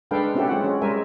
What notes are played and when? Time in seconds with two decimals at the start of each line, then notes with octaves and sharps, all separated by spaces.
0.11 G#3 D4 A4 B4 F5 G5
0.35 C4 C#4 E4 F#4 G4 A4
0.48 G#3 F4 F#5
0.64 C#4 F#4
0.81 G3 G#3 A#4 C5 E5 G#5